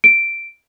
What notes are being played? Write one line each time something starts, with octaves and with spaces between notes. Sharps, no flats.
D7